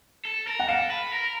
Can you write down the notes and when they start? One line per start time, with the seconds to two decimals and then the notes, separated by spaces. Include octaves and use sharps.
0.25 A4
0.47 A#4
0.60 F#5
0.69 A4 F5
0.90 B4
1.13 A#4